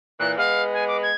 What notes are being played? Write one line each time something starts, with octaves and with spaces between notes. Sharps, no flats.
A#2 E3 F#6
G#3 B3 F5
G#5
D6
G#6